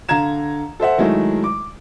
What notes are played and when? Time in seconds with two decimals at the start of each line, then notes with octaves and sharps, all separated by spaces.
0.09 D3 F5 A#5 G#6 E7
0.80 A4 C5 E5 F#5
0.98 D#3 F#3 G#3 A3 E4
1.44 D6